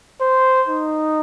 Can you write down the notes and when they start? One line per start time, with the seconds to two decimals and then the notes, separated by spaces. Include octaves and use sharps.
0.21 C5
0.68 D#4